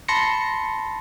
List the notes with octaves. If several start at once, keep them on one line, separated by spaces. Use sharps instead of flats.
A5 B5 C6 A#6 C#7